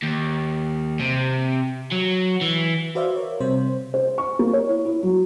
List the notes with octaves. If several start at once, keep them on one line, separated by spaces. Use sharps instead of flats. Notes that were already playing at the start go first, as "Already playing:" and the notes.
D#2
C3
F#3
E3
F#4 B4 C5 D5 E5 F5
A#4 C#5
C3 G3 C4 C5
C5
C#6
A#3
C#5
E4
E4
F#3